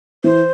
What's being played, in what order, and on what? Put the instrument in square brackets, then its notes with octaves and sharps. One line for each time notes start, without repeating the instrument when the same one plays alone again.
[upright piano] E3 [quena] C5